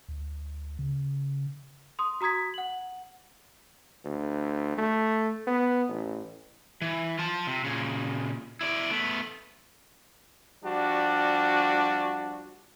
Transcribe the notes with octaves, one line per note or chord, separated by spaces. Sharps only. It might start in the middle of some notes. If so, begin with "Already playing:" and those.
D2
C#3
C6 D#6
F#4 A#5 D#6 G#6 B6
F#5 F#7
D2
A3
B3
A1
E3
F4 A5
C3
A#2 C#3
E4 D5
A3 B3
F3 G3 D4 F#4